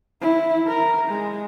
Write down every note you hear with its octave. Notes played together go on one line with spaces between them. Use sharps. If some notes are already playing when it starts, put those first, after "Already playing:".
E4
A#4
G#3